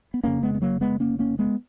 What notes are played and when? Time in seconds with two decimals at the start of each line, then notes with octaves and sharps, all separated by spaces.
0.14 B3
0.23 F1 F2 C#3 A#3 C#4
0.43 G#3 B3
0.54 B3
0.62 F#3 A#3
0.81 G#3 B3
1.00 A#3 C#4
1.19 A#3 C#4
1.39 G#3 B3